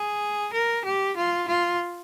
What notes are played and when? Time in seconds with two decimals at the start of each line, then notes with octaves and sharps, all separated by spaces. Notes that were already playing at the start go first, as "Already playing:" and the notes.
Already playing: G#4
0.53 A#4
0.85 G4
1.17 F4
1.48 F4